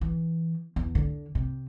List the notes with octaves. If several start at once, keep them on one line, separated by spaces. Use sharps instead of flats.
E3
E2
D3
C3